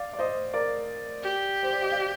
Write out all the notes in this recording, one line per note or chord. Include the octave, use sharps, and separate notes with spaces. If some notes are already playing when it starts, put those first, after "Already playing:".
Already playing: D5 F5
D5
C5 D#5
A#4 D5
G4
C5
D5
D#5
D5 F5